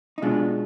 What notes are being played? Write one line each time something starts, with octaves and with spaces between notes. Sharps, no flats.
D#4
B2 G#3 D4 F4